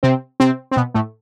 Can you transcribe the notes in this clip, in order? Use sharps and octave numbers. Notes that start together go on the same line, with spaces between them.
C3 C4
C3 C4
C4
B2 B3
A2 A3